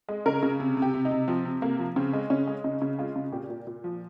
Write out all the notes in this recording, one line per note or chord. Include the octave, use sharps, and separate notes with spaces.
G#3
C#3 A#4
C#3
C3
C3
G4
C3
D#4
C3
F3 C4
C3
C3 A#3
F3
C#3 C4
G#3
C#3 C#4
G#3
C#3 D#4
C#3
G#3 F4
C#3
A#2 G4
A#2
A#2
F3